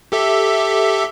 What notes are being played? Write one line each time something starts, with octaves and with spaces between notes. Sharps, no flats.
G4 A4 E5